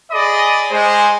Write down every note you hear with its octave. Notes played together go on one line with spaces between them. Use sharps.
G#4 D5 D#5 B5 D#6
G#3 C5